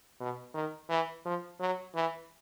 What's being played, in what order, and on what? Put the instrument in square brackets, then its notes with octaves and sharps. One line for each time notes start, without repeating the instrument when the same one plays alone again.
[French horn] B2
D#3
E3
F3
F#3
E3